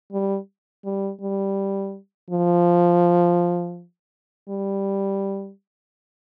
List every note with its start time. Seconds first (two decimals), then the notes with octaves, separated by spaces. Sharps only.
0.12 G3
0.85 G3
1.21 G3
2.30 F3
4.49 G3